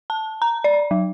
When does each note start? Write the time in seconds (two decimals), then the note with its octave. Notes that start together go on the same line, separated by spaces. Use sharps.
0.10 A5
0.42 A#5
0.64 D5
0.91 F#3